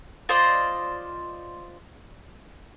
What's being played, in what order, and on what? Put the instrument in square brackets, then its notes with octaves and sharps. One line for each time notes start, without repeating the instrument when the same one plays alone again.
[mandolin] F4 C5 D5 D#5